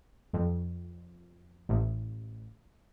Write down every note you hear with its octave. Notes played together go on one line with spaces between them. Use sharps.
F2
A1